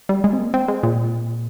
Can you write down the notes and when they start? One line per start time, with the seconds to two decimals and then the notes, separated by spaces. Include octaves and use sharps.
0.09 G3
0.24 G#3
0.33 C4
0.39 A#3
0.54 C4
0.68 G#3
0.83 A#2